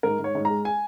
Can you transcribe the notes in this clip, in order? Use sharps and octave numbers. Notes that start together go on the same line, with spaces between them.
G#2 A#4
G#2 C#5
G#2
A#5
G#3
G#5